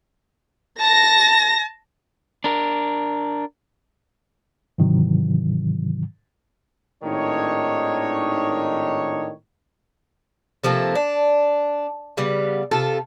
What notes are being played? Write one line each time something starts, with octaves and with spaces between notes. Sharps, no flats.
A5 A#6
D4 A#4
G#2 C3 D#3 E3 F#3
G#1 A2 D#3 D4 D#4 C#5
C3 F3 A3 A#3
D4
C#3 G3 B3
C3 F4 A4